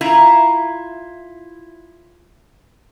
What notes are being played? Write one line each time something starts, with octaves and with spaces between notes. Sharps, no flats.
E4 F4 E5 A#5